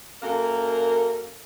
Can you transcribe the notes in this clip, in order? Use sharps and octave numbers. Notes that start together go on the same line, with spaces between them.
F#2 A#3 A4 A#4